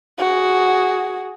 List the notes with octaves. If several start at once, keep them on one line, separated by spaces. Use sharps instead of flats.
F#4 G#4